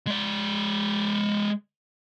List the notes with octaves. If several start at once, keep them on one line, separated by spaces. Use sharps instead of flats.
G#3 D5